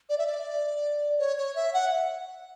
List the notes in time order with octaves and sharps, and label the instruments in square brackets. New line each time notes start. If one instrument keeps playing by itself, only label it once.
[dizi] D5
E5
D5
C#5
C#5
E5
F#5